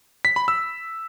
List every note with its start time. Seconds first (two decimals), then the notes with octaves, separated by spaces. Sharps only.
0.25 B6
0.36 B5
0.48 E6